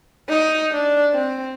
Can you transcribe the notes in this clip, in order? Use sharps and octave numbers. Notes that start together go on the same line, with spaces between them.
D#4
D4
C4